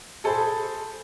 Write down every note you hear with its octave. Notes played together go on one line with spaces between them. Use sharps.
G#4 A4 C5 B5